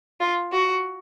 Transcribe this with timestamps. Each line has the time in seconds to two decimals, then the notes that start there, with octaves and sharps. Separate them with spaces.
0.20 F4
0.52 F#4